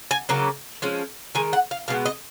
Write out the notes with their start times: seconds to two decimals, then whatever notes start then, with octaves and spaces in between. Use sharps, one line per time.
0.11 G#5
0.29 C#3 F#3 A#3 C#4
0.82 F3 G#3 C#4
1.35 D#3 G#3 G#5
1.53 F#5
1.71 F5
1.88 B2 G#3 B3 F5
2.06 D#5